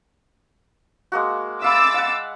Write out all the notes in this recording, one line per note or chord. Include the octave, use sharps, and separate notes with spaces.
G#3 A#3 F#4
E5 F5 B5 D6 E6 A6
F5 F#5